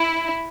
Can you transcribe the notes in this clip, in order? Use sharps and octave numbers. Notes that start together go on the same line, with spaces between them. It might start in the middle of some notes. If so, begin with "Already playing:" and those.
Already playing: E4